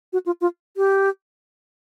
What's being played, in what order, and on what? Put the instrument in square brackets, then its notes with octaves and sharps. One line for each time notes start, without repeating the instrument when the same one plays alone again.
[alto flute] F#4
F4
F4
G4